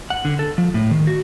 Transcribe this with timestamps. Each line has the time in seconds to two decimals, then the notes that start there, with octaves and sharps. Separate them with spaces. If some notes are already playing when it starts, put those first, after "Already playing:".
0.10 F#5
0.25 D3
0.39 A4
0.58 F3
0.74 A2
0.91 D#3
1.07 F#4